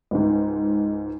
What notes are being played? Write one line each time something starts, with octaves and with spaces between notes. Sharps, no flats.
C#2 G#2